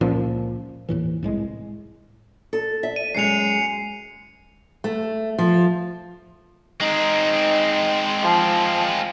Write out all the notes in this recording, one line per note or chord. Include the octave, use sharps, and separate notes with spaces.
C#2 A#2 F3 C#4
D#2 A2 E3
C2 A2 G#3
A4
E5
D#7
F#2 G#3 C7 C#7 F7
A3
F3
G#3 C4 D#4
F3